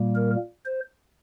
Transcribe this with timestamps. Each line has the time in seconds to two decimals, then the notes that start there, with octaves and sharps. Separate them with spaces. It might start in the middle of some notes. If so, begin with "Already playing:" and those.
Already playing: A#2 G3 A#3
0.15 A#4
0.65 C5